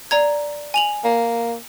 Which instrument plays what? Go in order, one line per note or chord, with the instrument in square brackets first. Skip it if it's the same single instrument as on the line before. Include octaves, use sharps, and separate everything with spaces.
[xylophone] D5 A#5 G#6
G#5 F7 F#7
[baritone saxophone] A#3